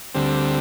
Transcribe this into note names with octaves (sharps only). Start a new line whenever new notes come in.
D2 D3 G3 C4